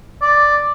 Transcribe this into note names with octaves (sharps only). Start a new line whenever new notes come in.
D5